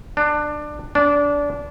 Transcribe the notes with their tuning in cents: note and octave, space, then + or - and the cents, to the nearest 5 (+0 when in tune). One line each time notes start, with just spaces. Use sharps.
D4 +20
D4 -20